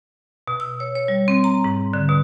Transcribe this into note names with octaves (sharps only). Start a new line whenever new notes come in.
B2
E6
C#5
C#5
G3
C4
A#5
G#2
D3
B2